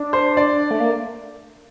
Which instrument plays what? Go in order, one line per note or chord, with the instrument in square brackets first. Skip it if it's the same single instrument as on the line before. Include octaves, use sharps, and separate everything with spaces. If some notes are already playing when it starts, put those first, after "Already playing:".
Already playing: [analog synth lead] D4
[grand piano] C5
D5
[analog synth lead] A3
A#3